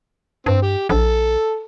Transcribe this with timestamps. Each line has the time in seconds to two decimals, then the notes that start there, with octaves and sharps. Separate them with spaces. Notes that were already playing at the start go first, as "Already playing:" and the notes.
0.46 G2 C4
0.63 G4
0.89 A#1 A4